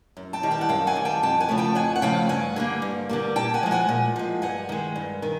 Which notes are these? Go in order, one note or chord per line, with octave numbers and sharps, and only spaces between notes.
F#2
G5 A5
D#3 G3
G5 A5
F#5
F#2 F5 G5
F#5 G#5
D#3 G3
G5 A5
F2 G5 A5
F#5 G#5
C#3 F3 A3
G5 A5
F2 F#5 G#5
F#5
C#3 F3 A3 F5 G5
G2 F#5 G#5
D3 G3 A#3
G2
D3 G3 A#3
A#2 G5 A5
F#5 G#5
F3 G#3
F#5 G#5
A#2
F3 G#3
G2 F#5 G#5
D#3 G#3
G2
D#3